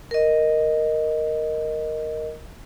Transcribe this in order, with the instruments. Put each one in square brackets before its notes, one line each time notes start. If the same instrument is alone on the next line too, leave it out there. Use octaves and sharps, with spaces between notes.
[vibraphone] A#4 D#5